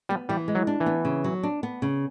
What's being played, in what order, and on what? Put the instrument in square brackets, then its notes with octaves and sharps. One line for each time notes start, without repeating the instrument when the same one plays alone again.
[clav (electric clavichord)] G3 [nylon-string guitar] B3
[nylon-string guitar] E3 [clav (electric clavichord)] G3
[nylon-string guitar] G#3
[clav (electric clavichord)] F#3
[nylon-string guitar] D4
[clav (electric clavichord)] E3
[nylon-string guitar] B3
C#3
F#3
D4
B3
C#3